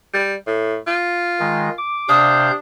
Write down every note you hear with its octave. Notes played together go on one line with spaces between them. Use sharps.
G3
A2
F4
D#3 G#3
D6
C3 D4 F5 D#6 G6